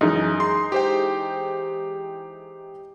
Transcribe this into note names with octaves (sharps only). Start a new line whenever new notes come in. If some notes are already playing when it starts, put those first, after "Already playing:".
F#2 E3 G#3 D#4
C6
G4 C5 G5